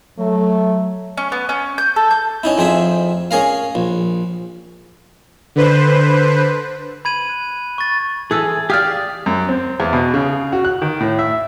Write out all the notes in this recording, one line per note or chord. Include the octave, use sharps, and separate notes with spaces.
F#3 A3
C#4
B3
C#4
G6
A4
G6
C#4 D#4 E4
F2 C4 G#4 E5
C#4 G#4 A#4 F5
A#1
D3 B4 C5
B5 G#6 D#7 F#7
F#6
C#6 A6
E3 G#4 A4
G4 G#4 D5 F5 F6
F#2
C4
E2
B2
C#3
F#4
F#6
D#3
A2
E5